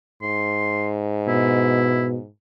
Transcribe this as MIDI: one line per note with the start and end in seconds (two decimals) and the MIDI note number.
0.22 2.28 44
0.22 0.89 84
1.27 2.17 47
1.27 2.07 64